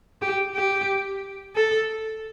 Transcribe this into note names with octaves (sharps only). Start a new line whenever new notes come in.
G4
G4
A4